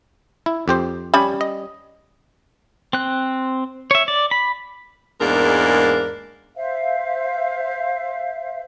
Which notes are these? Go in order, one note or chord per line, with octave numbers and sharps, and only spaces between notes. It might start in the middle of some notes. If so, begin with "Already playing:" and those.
E4
F2 G4 C5
G3 C#4 B5
D#5
C4 F#6
C#5 E5
D5
B5
E2 G#2 G#3 A#3 D4 A#4
C5 E5 F5